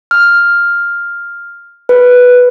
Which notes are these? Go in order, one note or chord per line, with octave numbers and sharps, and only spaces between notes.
F6
B4